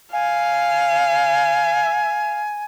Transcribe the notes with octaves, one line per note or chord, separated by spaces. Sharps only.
F5 G#5